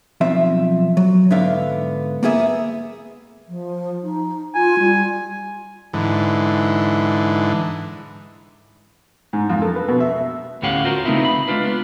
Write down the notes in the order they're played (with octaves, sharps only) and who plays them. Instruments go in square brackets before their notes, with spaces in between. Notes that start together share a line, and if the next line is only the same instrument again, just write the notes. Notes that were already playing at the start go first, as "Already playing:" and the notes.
[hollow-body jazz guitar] B1 F3 C4 E5
F#3
G#2 D3 B3 D4 E5 F5
A#3 B3 G#4 E5
[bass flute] F3
D#4
[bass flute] F4 [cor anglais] G#5
[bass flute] G3
[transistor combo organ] G#2 D3 E3
[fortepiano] G#2
F2
A4
B4
B2
E5
[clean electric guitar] D2 A2 C#4 G4 F5 F#5
F4 F#4 A#4 C5
C#3 A3 B3 C4 D#4 E4
B5
G#3 A3 D4 F4 B4
B3